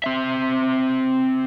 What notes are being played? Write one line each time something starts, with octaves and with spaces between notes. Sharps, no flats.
C4 E5